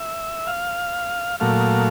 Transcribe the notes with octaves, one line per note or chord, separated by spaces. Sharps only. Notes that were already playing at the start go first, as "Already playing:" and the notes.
Already playing: E5
F5
A#2 F#3 A3 F5